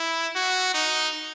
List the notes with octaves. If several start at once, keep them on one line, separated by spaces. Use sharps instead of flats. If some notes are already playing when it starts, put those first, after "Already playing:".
Already playing: E4
F#4
D#4